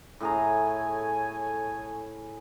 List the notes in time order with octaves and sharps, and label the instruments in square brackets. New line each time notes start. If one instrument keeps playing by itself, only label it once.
[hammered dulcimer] A2 G#4 A#5 [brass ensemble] A4 C#5 G#5